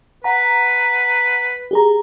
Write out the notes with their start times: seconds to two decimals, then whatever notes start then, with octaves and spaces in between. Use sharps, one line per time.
0.24 B4 F#5 A#5
1.71 G4 G#4 A#5